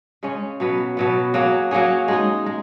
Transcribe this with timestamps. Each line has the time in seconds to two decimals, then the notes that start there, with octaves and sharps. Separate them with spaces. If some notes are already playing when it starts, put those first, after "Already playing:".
0.23 C#3 G#3 C#4
0.60 B2 F#3 B3
0.97 B2 F#3 B3
1.34 F#3 A#3 C#4 G#4
1.71 F#3 A#3 C#4 G#4
2.08 G#3 D#4 G#4
2.46 G#3